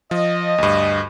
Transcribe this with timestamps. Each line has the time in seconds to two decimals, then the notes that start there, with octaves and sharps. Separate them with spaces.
0.11 F3 D#5
0.58 D2 G2